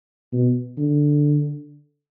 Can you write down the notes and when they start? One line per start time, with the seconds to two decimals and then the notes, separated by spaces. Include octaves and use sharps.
0.33 B2
0.78 D3